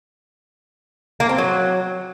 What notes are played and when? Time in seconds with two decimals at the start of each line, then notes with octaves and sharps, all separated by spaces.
1.20 A#3
1.29 C4
1.38 F#3